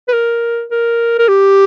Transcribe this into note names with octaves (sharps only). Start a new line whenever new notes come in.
B4
A#4
A#4
A#4
G4